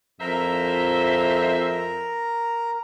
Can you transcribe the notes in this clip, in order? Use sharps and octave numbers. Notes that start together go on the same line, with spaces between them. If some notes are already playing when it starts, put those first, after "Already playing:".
F2 A2 A#4 C5 E5 A#5